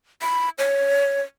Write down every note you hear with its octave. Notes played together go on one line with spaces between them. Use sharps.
B5
C#5